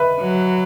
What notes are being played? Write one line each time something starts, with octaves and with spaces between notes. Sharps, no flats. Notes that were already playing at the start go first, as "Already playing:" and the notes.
Already playing: B4 E5
F#3